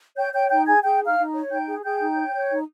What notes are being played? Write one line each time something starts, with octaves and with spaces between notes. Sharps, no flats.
C#5 G5 G6
C#5 G5 G6
D#4 G5 G6
G#4 G#5 G#6
G#4 G5 G6
D#4
F5 F6
D#4
C#5
D#4 G5 G6
G#4
G#4 G5 G6
D#4
C#5
C#5
D#4